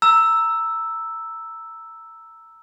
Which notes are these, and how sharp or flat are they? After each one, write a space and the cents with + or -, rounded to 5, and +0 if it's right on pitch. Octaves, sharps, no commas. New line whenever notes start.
A#5 -10 E6 +0